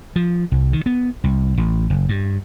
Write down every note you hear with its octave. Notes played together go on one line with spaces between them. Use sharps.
F3
C2
D#3
B3
C2
A1
F#1
G2